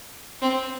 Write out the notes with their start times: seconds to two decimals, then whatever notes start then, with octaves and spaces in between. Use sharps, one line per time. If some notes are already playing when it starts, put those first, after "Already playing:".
0.42 C4